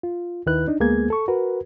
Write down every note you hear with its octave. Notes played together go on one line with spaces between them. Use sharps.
F4
D#2 D#3 E4 B4 F#6
D4 D#4
D2 G#3 A#3 B3 G#4 G#6
A4 C#6
F#4 A#4 B4